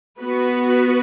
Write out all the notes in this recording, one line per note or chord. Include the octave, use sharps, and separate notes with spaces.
B3 F#4 B4